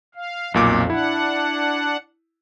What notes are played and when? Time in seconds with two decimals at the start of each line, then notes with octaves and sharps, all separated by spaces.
0.15 F5
0.54 B1 F2 A#2 D6
0.90 D4 E4 F#5